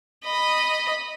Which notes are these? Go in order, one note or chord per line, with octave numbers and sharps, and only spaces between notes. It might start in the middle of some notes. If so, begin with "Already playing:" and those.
D#5 B5